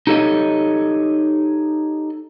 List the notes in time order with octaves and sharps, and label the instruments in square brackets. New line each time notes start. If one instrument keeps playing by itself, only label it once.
[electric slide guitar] D#4 G4 A4 C#5 D#5